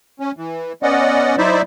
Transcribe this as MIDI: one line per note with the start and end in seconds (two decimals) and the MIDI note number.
0.20 0.31 61
0.37 0.73 52
0.83 1.36 59
0.83 1.36 61
0.83 1.36 74
0.83 1.36 75
0.83 1.36 78
1.38 1.62 54
1.38 1.62 63
1.38 1.62 64
1.38 1.62 72
1.38 1.62 74
1.38 1.62 76